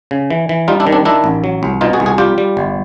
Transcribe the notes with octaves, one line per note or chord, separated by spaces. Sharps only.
C#3
E3
E3
G3 D#4 F4
D4 E4
D#3
C4 D4
D#3 D4 E4
A1
F#3
C2
B2 D#4 F4
F#4 G#4
C2
F#4 G#4
G3 F4 G4
G3
G1